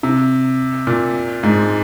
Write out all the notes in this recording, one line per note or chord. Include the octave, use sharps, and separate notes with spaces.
C3
A#2
G#2